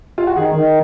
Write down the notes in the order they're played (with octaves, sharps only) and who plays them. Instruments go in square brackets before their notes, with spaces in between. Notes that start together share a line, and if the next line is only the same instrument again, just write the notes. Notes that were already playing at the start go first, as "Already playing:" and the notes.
[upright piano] F4
F#4
[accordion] D#3 [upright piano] G#4
[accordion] D#3